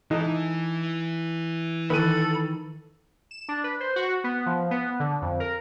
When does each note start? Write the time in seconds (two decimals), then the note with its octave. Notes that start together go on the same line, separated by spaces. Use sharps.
0.11 E3 D#4 A4
1.90 D#3 E3 A4 B4 B5 D#7
3.31 E7
3.48 D4
3.64 B4
3.80 C5
3.96 F#4
4.24 B3
4.46 F3
4.71 B3
5.00 D3
5.22 F2
5.40 A#4